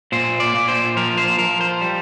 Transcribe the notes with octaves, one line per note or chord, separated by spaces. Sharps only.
A#2 C5
D5
A#2
C5
F3 A#4
C5
F3 A#4
C5
G3